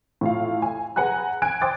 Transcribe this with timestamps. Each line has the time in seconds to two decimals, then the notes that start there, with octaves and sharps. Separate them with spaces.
0.21 A2 F4 F5
0.62 G#5
0.96 G#4 B4 F#5 G#5 A#5 F#6
1.42 G#5 F#6 G#6 D7
1.62 C5 G5 C6 D6 D#6 A6